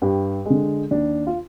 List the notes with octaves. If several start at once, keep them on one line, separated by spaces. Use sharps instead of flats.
G2 G4
D3 G#3
D#2 D4
F4